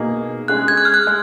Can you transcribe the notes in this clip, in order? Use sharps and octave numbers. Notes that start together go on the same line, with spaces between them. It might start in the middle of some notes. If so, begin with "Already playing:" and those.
Already playing: B2 A#3 D#4 G#4
G#3 C#4 G#4 F#6
G#6
F#6
F6
F#6
G#3